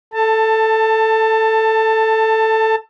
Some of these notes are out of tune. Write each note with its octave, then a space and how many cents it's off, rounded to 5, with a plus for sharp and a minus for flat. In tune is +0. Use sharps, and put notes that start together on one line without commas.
A4 +0 A5 +20